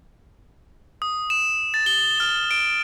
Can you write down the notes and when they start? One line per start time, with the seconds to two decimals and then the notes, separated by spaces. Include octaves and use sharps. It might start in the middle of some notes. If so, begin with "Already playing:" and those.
1.02 D#6
1.30 E7
1.74 A6
1.86 G7
2.20 F6
2.51 D7